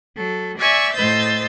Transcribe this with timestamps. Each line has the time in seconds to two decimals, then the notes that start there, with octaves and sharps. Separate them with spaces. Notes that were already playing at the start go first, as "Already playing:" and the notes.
0.15 F#3 A4
0.58 D5 E5 G#5 C#6 E6
0.94 A2 C5 D#5 E6 G6 A6